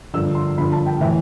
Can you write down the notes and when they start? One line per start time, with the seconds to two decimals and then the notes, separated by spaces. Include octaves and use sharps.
0.14 G2 D3 F3 E6
0.35 C6
0.58 G2 D3 F3 B5
0.72 A5
0.86 G5
1.01 A2 E3 E5